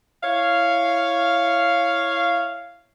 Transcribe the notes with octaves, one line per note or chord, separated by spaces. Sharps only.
E4 C#5 F5